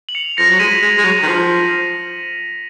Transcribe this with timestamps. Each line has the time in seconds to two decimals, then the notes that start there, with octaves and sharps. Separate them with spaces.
0.09 F#7
0.15 C#7 F7
0.37 F3 A#6 C#7
0.50 F#3
0.59 G#3 B6 D#7
0.82 G#3
0.98 G#3
1.04 F#3
1.23 D#3
1.27 F3